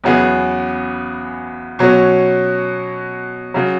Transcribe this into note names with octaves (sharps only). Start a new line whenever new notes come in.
E2 C#3 F#3 B3 G#4
B2 F#3 C#4
C#3 F#3